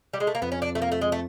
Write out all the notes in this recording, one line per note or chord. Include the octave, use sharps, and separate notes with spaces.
G3
G#3
A3
A#3
F2 B3
C#4
D4
A3
A#3
A3
G#3
A3